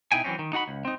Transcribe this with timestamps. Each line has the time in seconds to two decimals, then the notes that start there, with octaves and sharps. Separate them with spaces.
0.12 B2 D#4 E4 G5 G#5
0.24 E3 F#3 G#3 C4 C#4
0.39 D#3
0.53 D#4 F#4 F#5 B5
0.68 C#2
0.85 C4 D#4